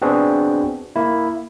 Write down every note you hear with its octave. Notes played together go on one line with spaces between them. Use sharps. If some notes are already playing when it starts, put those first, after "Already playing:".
B3 C4 D4 F#4 G#4
A#3 E4